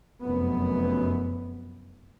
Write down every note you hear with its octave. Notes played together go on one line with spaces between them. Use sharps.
F1 F#2 B3